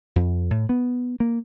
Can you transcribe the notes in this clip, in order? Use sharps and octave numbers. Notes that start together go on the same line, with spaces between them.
F2
A2
B3
A#3